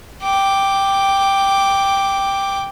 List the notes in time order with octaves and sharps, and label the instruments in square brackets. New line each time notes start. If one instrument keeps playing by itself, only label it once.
[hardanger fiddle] G5 D6